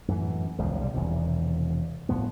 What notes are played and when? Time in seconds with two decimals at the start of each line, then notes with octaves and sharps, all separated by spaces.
0.08 F#2 A2 E3
0.59 E1 C#2 C#3 F3
0.78 B1 C3 G3
0.93 E1 E2 C3 D#3
2.09 G1 A2 F3 B3